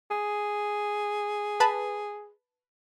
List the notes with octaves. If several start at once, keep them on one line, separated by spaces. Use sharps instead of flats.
G#4
B4 A5 B5